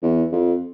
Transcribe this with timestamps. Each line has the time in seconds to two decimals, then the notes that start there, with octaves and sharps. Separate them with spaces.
0.02 E2
0.32 F2